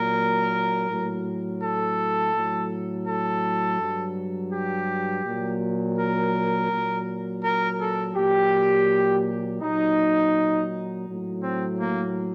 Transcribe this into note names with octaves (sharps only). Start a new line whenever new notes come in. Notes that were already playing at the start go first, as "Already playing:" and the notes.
Already playing: A#2 F#3 A#4
A2 F#3
A4
A2 F#3
A4
G2 F#3
G4
A#2 F#3
A#4
A#2 F#3
A#4
A4
A#2 F#3 G4
A#2 F#3 D#4
A2 F#3
C4
A#3